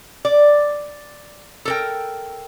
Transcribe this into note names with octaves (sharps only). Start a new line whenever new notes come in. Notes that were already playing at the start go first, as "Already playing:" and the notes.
D5
A4 A#4 G5